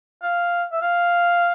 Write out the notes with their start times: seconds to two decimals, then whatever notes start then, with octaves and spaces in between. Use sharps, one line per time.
0.23 F5
0.72 E5
0.82 F5